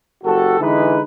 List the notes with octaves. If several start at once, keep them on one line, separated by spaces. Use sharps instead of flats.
F#1 F#4 G4 A4
D3 E3 G#3 D#4 B4